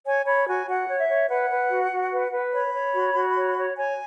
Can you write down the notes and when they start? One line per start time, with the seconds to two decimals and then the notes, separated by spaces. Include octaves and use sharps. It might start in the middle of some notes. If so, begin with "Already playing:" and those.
0.06 C#5 G#5
0.27 C#5 B5
0.47 F#4 G#5
0.68 F#4 F#5
0.88 C#5
0.99 E5
1.09 C#5
1.30 B4 F#5
1.50 B4
1.70 F#4
1.92 F#4
2.13 B4
2.33 B4
2.53 C#5 B5
2.74 C#5
2.95 F#4
3.15 F#4
3.36 C#5
3.57 C#5
3.77 C#5 G#5